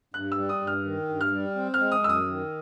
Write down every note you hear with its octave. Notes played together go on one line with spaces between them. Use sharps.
G2 F#6
E6
G3
D#6
G2
F6
D#3
G2
F6
G3
C4
F6
G#3
D#6
F#2 E6
D#6
D#3